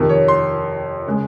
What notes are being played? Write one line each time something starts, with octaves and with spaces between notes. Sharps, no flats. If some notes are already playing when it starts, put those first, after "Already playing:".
Already playing: F2 C3 D#3
C#5
C6
C#3 G#3